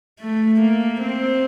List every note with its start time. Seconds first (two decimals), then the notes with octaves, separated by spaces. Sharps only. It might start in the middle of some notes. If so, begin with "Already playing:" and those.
0.21 A3
0.61 A#3
1.01 C4